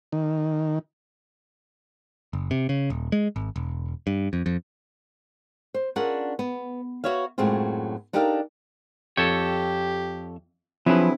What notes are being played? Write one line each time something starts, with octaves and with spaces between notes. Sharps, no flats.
D#3
F#1
C3
C#3
D#1
G#3
G#1
E1
G2
F2
F2
C5
C#4 D4 F4 G#4 A#4 F#5
B3
F#4 B4 C#5 E5 F5
F#2 A2 F#3 G#3 C4 F4
D4 D#4 G4 A4 A#4 F5
F2 G4 A4 C#5 G5
F3 F#3 C4 D4 E4 G#4 B4